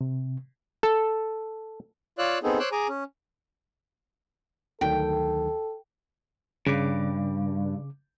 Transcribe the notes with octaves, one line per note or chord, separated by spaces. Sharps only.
C3
A4
F4 C#5 D5 F5 E6 F#6
B3 C4 D#4 G#4 A4
C5 C#5 C6 D6 E6 F#6
G#4 G#5 A#5 D6
C#4
D2 D#3 F#3 A4 G5
G2 C#3 D6